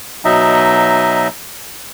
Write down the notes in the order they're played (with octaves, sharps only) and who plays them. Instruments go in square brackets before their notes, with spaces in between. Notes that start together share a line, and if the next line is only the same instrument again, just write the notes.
[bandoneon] B2 F#3 D#4 D#5 E5